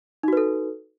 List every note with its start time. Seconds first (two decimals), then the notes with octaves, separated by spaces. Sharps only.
0.23 D#4
0.28 F#4
0.33 B4
0.37 A4